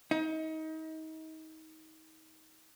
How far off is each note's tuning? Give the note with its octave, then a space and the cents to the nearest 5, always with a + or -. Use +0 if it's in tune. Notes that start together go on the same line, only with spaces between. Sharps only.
D#4 +30